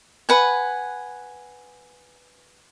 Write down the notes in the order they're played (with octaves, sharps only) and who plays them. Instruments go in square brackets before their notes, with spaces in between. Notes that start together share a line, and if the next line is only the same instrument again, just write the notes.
[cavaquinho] B4 F#5 G#5